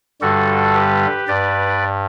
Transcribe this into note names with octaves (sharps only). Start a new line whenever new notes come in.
G2 D3 G3 F#4 A4
G4 B4
G2 B4 D5